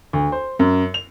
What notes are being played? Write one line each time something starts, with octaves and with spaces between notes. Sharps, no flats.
D2
C5
F#2
F7